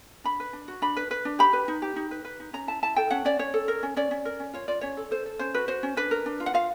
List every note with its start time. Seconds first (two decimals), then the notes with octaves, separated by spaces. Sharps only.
0.24 D4 B5
0.40 B4
0.53 D4
0.68 F#4
0.82 D4 B5
0.97 B4
1.11 B4
1.25 D4
1.39 G4 B5
1.53 B4
1.68 D#4
1.82 G4
1.96 D#4
2.11 B4
2.25 B4
2.40 D#4
2.53 C#4 A#5
2.67 E4 A5
2.82 E4 A5
2.96 A4 G5
3.11 C#4 F#5
3.25 C#4 D5
3.39 C#4 C#5
3.54 A4
3.68 A#4
3.83 C#4
3.97 C#4 D5
4.11 C#4
4.25 A#4
4.40 C#4
4.53 F4 C#5
4.68 F4 D5
4.81 C#4 C#5
4.97 A4
5.11 A4 C5
5.26 A4
5.39 C#4 C5
5.54 F#4 B4
5.68 F#4 C5
5.83 C#4
5.97 D4 B4
6.11 A#4
6.26 D4
6.40 F4
6.46 F#5
6.54 F4 F5